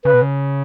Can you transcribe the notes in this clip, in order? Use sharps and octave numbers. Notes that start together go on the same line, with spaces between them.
C#3 B4
B2
C#3